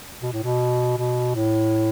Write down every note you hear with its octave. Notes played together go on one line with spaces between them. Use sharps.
B2
A2
B2
B2
A2